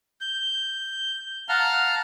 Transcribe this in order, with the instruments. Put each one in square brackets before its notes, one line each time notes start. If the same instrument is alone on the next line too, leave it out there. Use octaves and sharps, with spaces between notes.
[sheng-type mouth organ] G6
F5 F#5 A5 A#5 F6